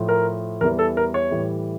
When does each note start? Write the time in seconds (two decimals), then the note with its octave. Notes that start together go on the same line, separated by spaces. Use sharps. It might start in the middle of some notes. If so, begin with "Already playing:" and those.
Already playing: A2 F3
0.09 A#4
0.61 E2 E3 G3 A#4
0.79 A4
0.97 A#4
1.14 C#5
1.31 A2 E3 G3